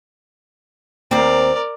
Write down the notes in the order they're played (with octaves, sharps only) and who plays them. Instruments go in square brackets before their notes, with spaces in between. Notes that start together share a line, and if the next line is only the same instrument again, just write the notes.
[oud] D#2 C4 [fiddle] A#4 D5